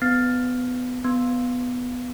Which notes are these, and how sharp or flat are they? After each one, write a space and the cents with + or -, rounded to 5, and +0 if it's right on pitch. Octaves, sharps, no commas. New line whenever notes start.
B3 +20
B3 +5